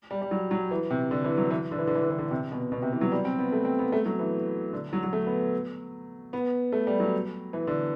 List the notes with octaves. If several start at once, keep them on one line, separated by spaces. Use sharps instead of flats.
G3
G3
F#3
F#3
E3
C3
D3
E3
F#3
E3
D3
E3
D3
E3
D3
E3
D3
C3
B2
B2
C3
E3
F#3
G3
C4
B3
A3
C4
B3
A3
F#3
E3
D3
F#3
F#3
A3
B3
B3
A3
G3
F#3
E3
D3